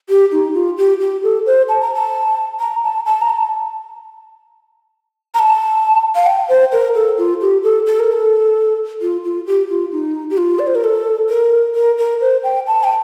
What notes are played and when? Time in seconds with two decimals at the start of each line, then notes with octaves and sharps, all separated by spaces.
0.09 G4
0.32 D#4
0.54 F4
0.77 G4
1.00 G4
1.23 A4
1.46 C5
1.69 A5
1.81 A#5
1.94 A5
2.60 A#5
2.84 A5
3.06 A5
3.21 A#5
3.30 A5
5.34 A#5
5.39 A5
6.15 F5
6.26 G5
6.49 C5
6.72 A#4
6.95 A4
7.18 F4
7.41 G4
7.63 A4
7.86 A4
8.00 A#4
8.12 A4
9.01 F4
9.24 F4
9.47 G4
9.69 F4
9.92 D#4
10.30 G4
10.37 F4
10.59 D5
10.67 C5
10.75 A#4
10.84 A4
11.29 A#4
11.75 A#4
11.98 A#4
12.21 C5
12.44 G5
12.67 A5
12.84 G5